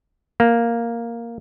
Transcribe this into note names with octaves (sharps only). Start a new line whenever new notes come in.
A#3